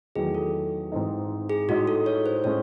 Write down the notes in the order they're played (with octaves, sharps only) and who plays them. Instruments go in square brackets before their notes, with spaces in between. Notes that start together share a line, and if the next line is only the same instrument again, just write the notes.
[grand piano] E2 D#3 F#3 A3 [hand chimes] G#4
[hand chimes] A4
[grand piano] G#2 E3 C4 D#4
[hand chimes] G#4
[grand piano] A2 G#3 D#4 [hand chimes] F#4
[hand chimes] A4
C#5
C5
[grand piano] A2 G#3 C#4 [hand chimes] C#5